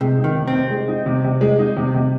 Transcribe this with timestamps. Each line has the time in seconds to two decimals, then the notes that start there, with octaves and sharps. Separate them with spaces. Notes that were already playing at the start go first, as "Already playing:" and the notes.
0.01 C3 G#3
0.18 D#4
0.24 D#3
0.36 C3
0.48 C4
0.53 C3
0.71 G#3
0.88 D#4
1.06 C3
1.24 C3
1.41 G#3
1.59 D#4
1.77 C3
1.94 C3